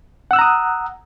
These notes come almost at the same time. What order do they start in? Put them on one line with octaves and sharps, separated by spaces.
F#5 E6 F#6 A#5 D#6